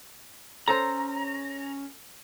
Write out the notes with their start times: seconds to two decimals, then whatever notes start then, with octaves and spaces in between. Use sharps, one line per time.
0.68 C#4 A4 C5 A#5